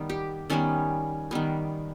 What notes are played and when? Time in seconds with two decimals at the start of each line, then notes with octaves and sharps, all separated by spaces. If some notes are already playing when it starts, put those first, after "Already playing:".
Already playing: D#3 G3 B3
0.10 G4
0.50 D#3 G3 B3 C#4
1.31 D#3 G3 B3